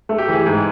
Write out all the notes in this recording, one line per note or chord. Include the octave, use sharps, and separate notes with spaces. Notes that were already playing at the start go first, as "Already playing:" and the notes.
A3
G4
E3 G#4
G#2